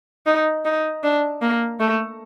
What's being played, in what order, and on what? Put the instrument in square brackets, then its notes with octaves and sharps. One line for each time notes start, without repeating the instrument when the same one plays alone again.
[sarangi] D#4
D#4
D4
A#3
A3